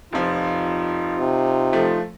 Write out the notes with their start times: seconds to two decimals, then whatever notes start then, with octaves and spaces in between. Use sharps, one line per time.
0.13 F1 F3 D#4 F4
1.19 C3
1.73 F3 A3